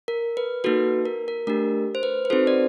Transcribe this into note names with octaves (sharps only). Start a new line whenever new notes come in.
A#4
B4
A#3 D#4 F#4 A4 B4
A#4
A#4
A3 D4 G4 A#4
C5
B4
B4
C4 D#4 F#4 A4 C5
D5